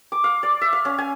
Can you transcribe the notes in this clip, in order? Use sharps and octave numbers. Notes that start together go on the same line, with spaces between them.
D6
F5
D5
E5
F5
C#4
G#5